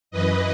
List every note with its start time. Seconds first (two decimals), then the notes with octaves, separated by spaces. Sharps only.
0.11 F#2 E3 B4 D#5